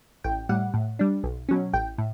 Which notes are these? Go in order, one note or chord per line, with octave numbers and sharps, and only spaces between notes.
A1 G5
A2 G3 F#5
A2
G3 D4
B1
B2 F#3 C#4
A1 G5
A2